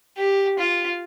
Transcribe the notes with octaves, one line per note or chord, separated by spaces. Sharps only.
G4
F4